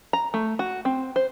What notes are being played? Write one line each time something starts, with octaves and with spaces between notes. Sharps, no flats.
A#5
A3
F#4
C4
C5